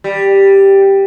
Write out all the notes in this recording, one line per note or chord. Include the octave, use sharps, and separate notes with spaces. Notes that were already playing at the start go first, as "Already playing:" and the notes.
G3